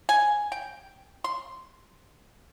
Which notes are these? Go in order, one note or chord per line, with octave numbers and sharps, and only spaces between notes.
G#5
G5
C6